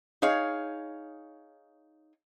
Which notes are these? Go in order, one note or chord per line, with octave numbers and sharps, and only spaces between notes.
D#4 G#4 C#5 F5